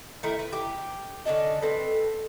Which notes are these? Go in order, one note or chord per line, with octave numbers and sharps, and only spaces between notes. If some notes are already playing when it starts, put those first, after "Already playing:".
D#3 A3 E4
B4
G4
D3 C#4 D4 D#5
C4 A4 B4